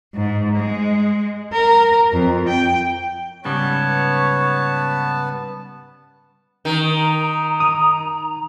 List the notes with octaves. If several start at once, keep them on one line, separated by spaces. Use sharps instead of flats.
G#2
G#3
A#4
F2
G5
G#2 C#3 G3 B3 B4 C#5 A5
D#3 A#5
D#6